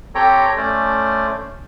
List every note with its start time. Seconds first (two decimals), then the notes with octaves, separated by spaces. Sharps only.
0.15 C4 G4 A4 C#5 G5 A#5
0.57 A3 C#4 C5 D5